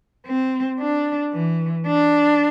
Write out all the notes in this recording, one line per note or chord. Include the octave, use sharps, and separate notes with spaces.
C4
D4
E3
D4